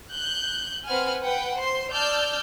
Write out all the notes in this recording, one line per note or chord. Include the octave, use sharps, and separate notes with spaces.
F#6 G6
C4 B4 C5 F#5 G#5 F6
B4 F#5 G5
C5 C6
D5 A5 E6 F6 G6